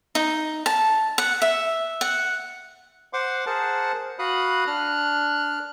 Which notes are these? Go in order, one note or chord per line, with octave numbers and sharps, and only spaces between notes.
D#4
A5
F#5
E5
F#5
C5 F#5 C6 D6
G#4 A#4 C5 F#5 A5
F#4 F5 B5 D#6 F#6
D4 F6 F#6